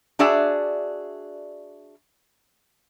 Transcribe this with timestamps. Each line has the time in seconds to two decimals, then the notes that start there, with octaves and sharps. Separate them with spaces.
0.19 D4 F#4 G#4 D5 E5